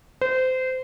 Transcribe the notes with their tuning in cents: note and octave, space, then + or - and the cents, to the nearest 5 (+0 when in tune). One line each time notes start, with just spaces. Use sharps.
C5 -25